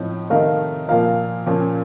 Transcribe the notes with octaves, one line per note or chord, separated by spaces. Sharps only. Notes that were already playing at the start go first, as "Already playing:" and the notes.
Already playing: A2 F3 C4 D#4
C3 D#3 A3 D#4 A#4 F5
A#2 F3 A#3 F4 A#4 F5
A#2 F3 A#3 C#4